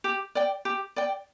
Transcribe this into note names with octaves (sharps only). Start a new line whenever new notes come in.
G4
D5 G5
G4
D5 G5